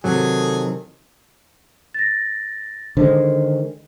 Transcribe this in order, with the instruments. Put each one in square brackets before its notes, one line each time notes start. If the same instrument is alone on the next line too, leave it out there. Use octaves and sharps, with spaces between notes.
[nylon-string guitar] C3 D#3 [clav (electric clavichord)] F#3 [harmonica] G#4 [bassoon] A4
[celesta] A6 A#6
[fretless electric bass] D3 D#3 G#3 [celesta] C5